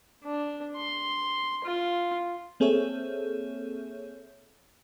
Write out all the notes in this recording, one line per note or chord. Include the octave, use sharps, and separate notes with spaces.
D4
C6
F4
A#3 C4 G#4 A4 C#5 E5